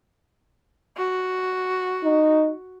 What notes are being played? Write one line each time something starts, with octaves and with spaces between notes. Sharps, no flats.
F#4
D#4